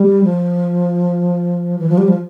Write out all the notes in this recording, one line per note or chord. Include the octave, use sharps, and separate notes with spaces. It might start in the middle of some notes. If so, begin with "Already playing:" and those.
Already playing: G3
F3
E3
F3
G3
F3